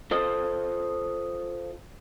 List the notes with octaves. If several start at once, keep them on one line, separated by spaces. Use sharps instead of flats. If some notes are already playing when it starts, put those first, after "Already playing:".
F4 A4 C5 D#5